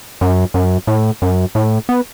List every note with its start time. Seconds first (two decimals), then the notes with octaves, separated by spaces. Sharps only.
0.21 F#2
0.54 F#2
0.87 A2
1.22 F#2
1.55 A2
1.89 B3